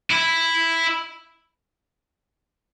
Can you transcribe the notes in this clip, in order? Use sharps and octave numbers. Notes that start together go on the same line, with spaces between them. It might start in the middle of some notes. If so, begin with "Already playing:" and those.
E4